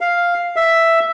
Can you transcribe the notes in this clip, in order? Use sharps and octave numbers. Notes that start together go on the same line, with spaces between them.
F5
E5